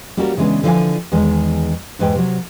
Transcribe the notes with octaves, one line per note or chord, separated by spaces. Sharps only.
G3 A#3 C#4 F#4 G4 A#4
C#3 E3 G#3 B3 D4
D3 F3 E4 C5 F5 G#5
E2 D#3 G#3
E2 G#2 B4 G5
C3 F#3